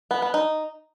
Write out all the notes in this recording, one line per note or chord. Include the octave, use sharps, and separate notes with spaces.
B3
B3
D#4